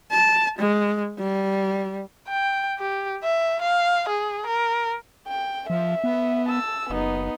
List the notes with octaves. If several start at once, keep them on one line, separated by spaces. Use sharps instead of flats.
A5
G#3
G3
G5
G4
E5
F5
G#4
A#4
G5
F3 E5
B3
A5 E6
F#1 B3 D#4